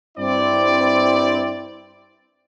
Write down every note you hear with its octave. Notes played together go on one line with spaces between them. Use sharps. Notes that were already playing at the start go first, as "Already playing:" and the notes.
G2 C4 E4 D5